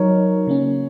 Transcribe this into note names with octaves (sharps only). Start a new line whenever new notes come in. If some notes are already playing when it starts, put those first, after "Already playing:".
Already playing: F#3 D#4 A#4 C#5
C#3 A#3 C#4